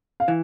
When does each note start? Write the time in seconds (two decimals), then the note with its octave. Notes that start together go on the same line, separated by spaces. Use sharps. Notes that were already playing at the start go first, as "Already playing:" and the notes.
0.20 F5
0.28 E3